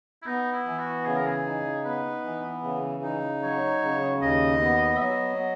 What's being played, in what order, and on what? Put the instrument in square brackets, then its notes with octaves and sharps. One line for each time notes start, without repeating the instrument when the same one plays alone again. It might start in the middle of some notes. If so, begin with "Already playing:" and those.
[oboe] E4
[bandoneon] B3 [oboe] D#4
[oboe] E4
[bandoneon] E3
[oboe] F#4
[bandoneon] C#3 [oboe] G#4
[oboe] A#4
G#4
[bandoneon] D#4
[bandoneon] B3 [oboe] B4
[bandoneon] E3
C#3
D#4
[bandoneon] F#3 [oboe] C#5
[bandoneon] C#3
[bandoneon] D#2 [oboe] D#5
[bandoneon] B3
[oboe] E5
[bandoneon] F#3 [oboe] D#5